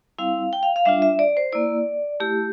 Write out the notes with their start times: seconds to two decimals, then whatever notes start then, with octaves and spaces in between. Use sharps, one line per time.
0.19 G3 C4 E4 F5
0.53 G5
0.63 F5
0.76 F5
0.85 G3 D4 F4 E5
1.02 E5
1.19 D5
1.37 C5
1.52 A#3 E4 D5
2.20 A3 E4 G4